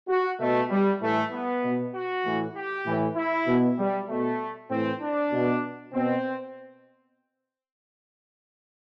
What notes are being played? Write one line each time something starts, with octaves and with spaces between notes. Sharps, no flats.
F#4
B2 A3
G3
A2 E3 A3
B3
B2
F#4
A2 E3
G4
A2 E3
E4
B2
G3
B2 A3
A2 E3 C4
D4
B2
B2 C4